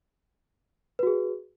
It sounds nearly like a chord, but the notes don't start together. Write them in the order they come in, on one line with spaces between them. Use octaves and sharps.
B4 F#4 G#4